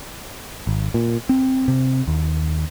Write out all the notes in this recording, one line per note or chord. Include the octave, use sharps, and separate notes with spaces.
G#1
A#2
C4
C3
D#2